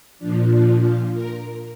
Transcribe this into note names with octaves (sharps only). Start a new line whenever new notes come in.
A#2 F3 D4
D4
F4
A#4